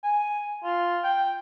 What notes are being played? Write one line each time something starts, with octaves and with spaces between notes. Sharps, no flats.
G#5
F4
G5